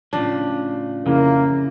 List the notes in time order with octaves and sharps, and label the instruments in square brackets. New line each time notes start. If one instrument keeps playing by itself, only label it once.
[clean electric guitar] A2 C#3 F3 [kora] D4
[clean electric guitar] F2 [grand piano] C#3 E4 [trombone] A#3